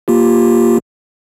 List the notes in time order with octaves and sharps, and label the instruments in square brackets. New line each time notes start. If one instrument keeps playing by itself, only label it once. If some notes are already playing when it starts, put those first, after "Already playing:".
[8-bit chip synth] A#3 F4 G4